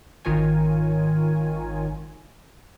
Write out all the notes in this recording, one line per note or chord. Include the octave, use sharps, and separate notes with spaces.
G#1 D#3 F4 A#4 C#5 G#5